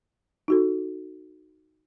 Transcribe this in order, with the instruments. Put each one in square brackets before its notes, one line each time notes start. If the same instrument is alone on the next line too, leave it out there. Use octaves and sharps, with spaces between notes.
[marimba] D#4 F#4 A4